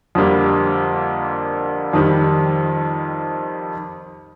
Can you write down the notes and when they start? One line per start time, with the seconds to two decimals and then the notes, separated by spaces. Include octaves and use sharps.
0.15 F2 D3 G3 A#3 D4
1.93 F2 D#3 G3